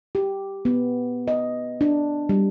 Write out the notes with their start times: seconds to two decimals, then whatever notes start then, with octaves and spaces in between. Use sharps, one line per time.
0.15 G4
0.65 B3
1.28 D#5
1.81 D4
2.29 G3